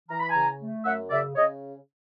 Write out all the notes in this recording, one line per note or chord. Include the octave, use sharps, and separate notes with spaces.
E3 A#5
B5
C#3 G#5 A#5
A3
F#2 E5 F#5
C#3 D5 E5
C#3 C#5 D#5